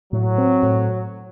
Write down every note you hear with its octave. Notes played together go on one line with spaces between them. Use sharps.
A2 F#3
C4
A2